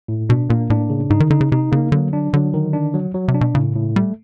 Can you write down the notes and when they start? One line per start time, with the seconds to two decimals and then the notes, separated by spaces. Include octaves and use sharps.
0.08 A2
0.29 B2 D4
0.49 A#2 A#3
0.70 A2 D4
0.90 C#3
1.10 G#2 D#4
1.20 D#3
1.30 D3 D#4
1.41 C#3
1.52 C3 D#4
1.72 C#3 A#3
1.92 D3 F#3
2.13 D4
2.33 D3 F#3
2.54 D#3
2.73 D4
2.94 F#3
3.15 F#3
3.28 C3
3.34 D4
3.41 B2
3.55 A2 C#3
3.76 A2
3.96 G3 A3